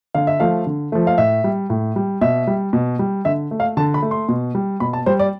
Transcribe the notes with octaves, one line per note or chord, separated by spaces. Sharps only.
D3 F5
E5
F3 A3 F5
D3
F3 A3
F5
A2 E5
G3
A2
G3
B2 E5
G3
B2
G3
D3 E5
A3
F5
D3 A5
B5
A3
C6
B2
G3
B2 B5
A5
G3 C5
D5